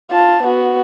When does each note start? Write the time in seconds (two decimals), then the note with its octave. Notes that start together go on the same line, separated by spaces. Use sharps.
0.11 F4 A5
0.43 B3 F#4